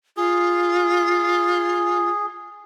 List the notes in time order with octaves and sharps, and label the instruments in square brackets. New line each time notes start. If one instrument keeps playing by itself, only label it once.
[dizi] F4 [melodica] G#4